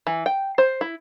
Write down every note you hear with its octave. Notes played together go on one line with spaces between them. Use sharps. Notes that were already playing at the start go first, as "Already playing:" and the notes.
E3
G5
C5
E4